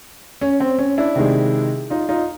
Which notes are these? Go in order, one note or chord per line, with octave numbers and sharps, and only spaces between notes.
C#4
C4
C#4
D4 E4
C3 D#3 G#3
D#4 F4
D#4 F4